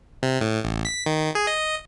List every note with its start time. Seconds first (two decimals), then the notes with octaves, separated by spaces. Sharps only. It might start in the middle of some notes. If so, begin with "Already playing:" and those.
0.23 C3
0.41 A2
0.65 A1
0.85 B6
1.06 D#3
1.35 G#4
1.47 D#5